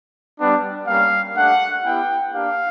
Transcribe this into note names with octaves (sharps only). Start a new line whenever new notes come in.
G3 B3 D4
G3 A#3 C#4 F5
A3 D4 G4 F#5
B3 E4 G4 G5
A#3 D4 G4 F5